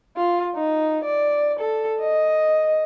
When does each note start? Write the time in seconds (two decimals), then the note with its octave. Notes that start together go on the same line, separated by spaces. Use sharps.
0.17 F4
0.55 D#4
1.04 D5
1.59 A4
2.00 D#5